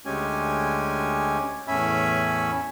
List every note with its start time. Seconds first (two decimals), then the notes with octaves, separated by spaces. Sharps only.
0.06 D2 G#3 C#4 G4 G#5
1.68 E2 A2 C#4 E5 G#5 B5